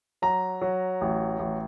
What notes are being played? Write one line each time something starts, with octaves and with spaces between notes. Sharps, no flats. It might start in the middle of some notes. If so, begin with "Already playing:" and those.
F#3 A#5
F#3
A1
A1